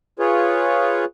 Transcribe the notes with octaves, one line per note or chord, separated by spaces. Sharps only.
F4 G#4 B4 C#5